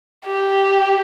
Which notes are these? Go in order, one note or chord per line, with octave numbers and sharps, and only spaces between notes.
G4